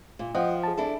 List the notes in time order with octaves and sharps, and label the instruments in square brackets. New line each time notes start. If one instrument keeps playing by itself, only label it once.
[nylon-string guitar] A#2
[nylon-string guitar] F3 [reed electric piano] D#5 F#5 G5
[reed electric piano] G#4 A5
[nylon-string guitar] D4 E4 A4